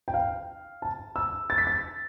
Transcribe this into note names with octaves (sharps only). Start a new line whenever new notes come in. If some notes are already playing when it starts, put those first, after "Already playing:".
G5
F5
A5
E6
A6
B6
A6